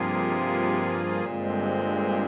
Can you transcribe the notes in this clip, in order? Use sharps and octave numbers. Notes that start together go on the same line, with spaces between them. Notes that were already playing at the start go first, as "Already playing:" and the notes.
Already playing: G2 C3 F3 A#3 F4 G#4
G2 A#2 D3 G#3 C4